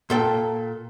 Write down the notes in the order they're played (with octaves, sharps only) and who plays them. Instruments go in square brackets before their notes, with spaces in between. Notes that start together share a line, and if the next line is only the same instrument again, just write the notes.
[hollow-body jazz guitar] A#2 A4 G5